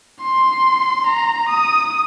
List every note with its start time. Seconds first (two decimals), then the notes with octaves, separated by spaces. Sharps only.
0.21 C6
1.07 A#5
1.49 D#6